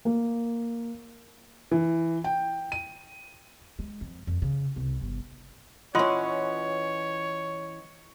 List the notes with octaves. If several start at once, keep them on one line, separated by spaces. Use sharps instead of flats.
A#3
E3
G5
D#7
G#3
F2
F2
C#3
C2
G1
E3 C#4 F4 C#5 D#5 F#5 C6